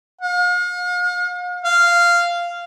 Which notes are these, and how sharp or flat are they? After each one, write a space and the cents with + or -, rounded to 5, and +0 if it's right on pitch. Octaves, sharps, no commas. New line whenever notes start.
F5 +45
F5 -10